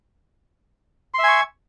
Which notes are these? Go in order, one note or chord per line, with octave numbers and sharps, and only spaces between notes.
E5 G#5 C6 C#6